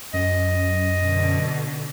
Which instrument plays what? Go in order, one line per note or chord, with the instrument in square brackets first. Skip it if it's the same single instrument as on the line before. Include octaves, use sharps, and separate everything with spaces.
[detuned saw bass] F#2 [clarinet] D#5
[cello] B2 D3